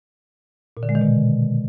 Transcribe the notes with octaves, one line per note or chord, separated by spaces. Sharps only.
A#2
D3
G#3
D#3
B2